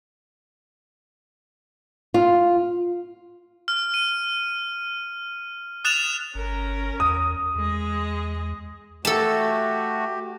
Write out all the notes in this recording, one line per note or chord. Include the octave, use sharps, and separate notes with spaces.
F4
F6
D#7
D#6 F#6 A6 E7 F7
G1 C#4 A#4
E2 D#6
E2 G#3 D#5
A3 F#4 G4 A4 A5